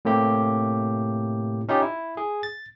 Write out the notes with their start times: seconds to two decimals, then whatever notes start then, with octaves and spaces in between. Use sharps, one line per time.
0.05 A2 C3 A#3 G4
1.69 C#4 D#4 F4 G4
1.82 E4
2.17 G#4
2.43 A6